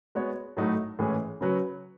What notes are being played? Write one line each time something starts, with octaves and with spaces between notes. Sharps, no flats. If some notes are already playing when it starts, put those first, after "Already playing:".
G#3 B3 F#4 C#5
A2 F#3 A3 D#4 F#4
A2 E3 G#3 C#4 G#4
C#3 F#3 C#4 F#4 B4